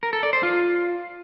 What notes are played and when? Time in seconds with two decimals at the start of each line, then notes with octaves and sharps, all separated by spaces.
0.03 A#4
0.13 A4
0.23 D5
0.33 C5
0.43 F4